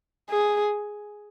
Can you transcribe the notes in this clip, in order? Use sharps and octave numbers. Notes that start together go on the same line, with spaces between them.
G#4